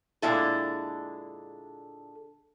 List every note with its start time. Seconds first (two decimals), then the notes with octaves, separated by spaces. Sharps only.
0.22 A#2 D3 G#3 E4 A4